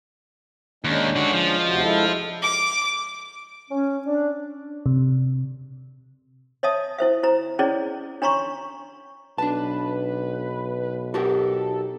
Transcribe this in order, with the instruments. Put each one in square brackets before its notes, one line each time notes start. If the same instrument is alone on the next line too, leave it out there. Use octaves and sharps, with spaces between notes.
[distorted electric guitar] D#2 [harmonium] G#3 C#4 D4
[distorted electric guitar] D3 F#4
F3
[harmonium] D2 C3 F#4
G#3 E4 A4
[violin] D6
[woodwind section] C#4
D4
[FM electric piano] C3
[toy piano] C#5 D#5 E5 A5 D#6
E4 C5 E5
E4 C5 A#5
C#4 E4 G#4 C#5 D5
D4 C#5 A#5 C6 C#6
[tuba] B1 [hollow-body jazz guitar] D4 A5 [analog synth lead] B4
[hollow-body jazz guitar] F#4 G4 A#4 [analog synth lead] A4